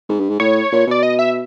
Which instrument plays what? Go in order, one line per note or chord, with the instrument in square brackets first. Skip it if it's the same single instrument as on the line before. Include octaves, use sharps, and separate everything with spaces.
[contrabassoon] G#2
G2
G#2
[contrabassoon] A2 [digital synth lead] C#5
[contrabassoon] A#2
[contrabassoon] B2 [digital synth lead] D5
[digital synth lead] D#5
E5